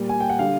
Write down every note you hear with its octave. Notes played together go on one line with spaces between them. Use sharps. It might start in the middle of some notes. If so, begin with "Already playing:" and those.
Already playing: A#2 G3
G#5
G5
F#5
D3 G3 F5